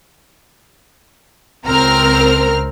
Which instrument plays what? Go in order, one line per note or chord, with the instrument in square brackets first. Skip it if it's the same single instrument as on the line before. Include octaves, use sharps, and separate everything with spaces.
[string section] C#2 C4 F6 [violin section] A#4 A#5